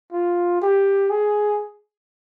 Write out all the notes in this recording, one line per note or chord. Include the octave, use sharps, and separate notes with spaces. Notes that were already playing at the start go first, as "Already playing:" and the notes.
F4
G4
G#4